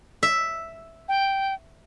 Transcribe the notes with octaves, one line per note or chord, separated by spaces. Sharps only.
E5
G5